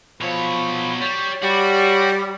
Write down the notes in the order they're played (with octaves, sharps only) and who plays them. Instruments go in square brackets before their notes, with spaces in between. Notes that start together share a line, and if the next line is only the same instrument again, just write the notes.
[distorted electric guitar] B2 C#5 [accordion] F3 B5
[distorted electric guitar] G3 [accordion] C#5
[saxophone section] G3 [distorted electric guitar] F#4